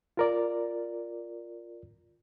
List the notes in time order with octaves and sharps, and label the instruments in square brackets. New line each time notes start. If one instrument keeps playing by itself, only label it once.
[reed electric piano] F4 A#4 D5